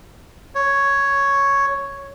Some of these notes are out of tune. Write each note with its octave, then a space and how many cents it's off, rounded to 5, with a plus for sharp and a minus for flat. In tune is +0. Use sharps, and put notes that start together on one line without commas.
C#5 +0